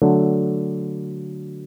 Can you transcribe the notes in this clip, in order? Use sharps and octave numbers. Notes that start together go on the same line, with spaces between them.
D3 F#3 A3 D4